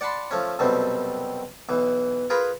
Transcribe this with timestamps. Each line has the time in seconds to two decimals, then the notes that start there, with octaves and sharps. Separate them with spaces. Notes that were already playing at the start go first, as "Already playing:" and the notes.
0.01 D5 F#5 A5 B5 C6
0.31 F3 A3 C#4
0.59 C2 F#2 B2 G3 A3 C4
1.69 B1 E3
2.30 F4 G#4 A#4 B4 A#5 B5